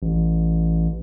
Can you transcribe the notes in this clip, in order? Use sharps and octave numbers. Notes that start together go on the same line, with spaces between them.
A1